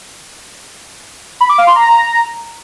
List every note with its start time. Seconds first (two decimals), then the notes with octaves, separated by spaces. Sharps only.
1.41 B5
1.49 D6
1.58 F5
1.67 C6
1.76 A#5